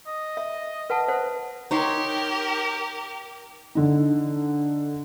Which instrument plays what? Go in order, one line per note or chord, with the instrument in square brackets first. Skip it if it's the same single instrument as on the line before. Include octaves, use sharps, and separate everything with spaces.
[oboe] D#5
[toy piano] E5
B4 F#5 A5
C5 F#5
[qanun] D#4 C#5 C6 [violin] G4 A#4
[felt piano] D3 D#4